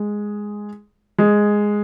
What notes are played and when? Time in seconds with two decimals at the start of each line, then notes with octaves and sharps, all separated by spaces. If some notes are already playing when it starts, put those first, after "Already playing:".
Already playing: G#3
1.18 G#3